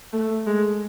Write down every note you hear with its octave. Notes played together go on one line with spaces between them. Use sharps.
A3
G#3